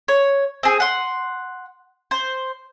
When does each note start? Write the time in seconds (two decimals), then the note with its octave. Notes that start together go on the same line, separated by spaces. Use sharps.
0.08 C#5
0.63 C4 G#4
0.80 F#5 C6
2.11 C5